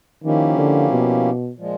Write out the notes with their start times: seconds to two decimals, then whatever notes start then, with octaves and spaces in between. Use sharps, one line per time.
0.23 D#3 F3 A#3 C#4 E4 G4
0.57 D3
0.90 B2
1.57 A#2 F3 G#3